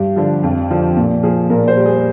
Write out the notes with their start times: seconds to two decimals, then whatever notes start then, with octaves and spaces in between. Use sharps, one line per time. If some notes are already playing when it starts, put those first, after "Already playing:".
Already playing: G2 G4
0.16 D3 F3
0.43 F2
0.70 D3 F3
0.97 A#2
1.23 F3 G#4
1.50 A#2 A#4
1.68 C5
1.77 G3
1.86 G#4